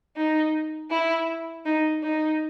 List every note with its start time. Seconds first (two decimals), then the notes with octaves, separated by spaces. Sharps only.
0.16 D#4
0.91 E4
1.66 D#4
2.03 D#4